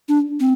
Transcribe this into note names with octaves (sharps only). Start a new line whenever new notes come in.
D4
C4